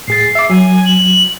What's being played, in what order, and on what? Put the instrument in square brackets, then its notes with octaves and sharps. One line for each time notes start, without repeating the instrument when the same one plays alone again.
[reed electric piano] A2 G#4 A6 [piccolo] C7
[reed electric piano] E5 D6
[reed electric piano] F#3 [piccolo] G#5
[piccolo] F#7